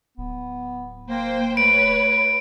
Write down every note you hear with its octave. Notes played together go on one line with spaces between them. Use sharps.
D1 B3
A#3 C5 G5
A3 B4 C#5 D7